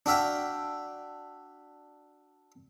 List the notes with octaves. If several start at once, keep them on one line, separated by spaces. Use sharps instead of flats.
D4 F#4 E5 F5 G5